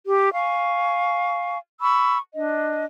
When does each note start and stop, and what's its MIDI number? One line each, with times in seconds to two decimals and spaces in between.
0.07 0.29 67
0.33 1.57 77
0.33 1.57 80
0.33 1.57 85
1.81 2.18 83
1.81 2.18 85
1.81 2.18 88
2.35 2.85 62
2.35 2.85 75